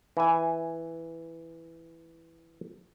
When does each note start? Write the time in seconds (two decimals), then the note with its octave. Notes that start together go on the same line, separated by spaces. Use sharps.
0.17 E3 G#5